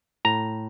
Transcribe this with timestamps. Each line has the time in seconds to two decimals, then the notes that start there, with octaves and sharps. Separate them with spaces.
0.25 A2 A#5